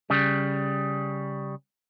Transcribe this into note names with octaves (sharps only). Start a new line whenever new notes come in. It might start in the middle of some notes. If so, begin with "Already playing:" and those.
C#3 G3